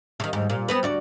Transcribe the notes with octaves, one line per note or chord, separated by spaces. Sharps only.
C3 D#3
D#2 G#2
A#2
B3 C4 B4
D2 F#4 D5